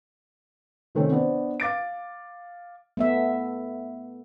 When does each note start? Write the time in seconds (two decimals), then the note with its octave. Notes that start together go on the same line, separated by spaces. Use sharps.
0.95 C3 D#3 A3 C4 C#4
1.11 B3 D4 C5
1.60 F5 D6 A6 D7
2.97 A3 B3 E5